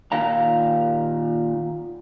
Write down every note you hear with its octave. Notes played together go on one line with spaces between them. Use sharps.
A#2 D#3 F5 A#5